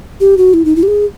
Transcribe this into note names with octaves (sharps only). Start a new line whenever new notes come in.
G4
F#4
E4
D#4
E4
G4
G#4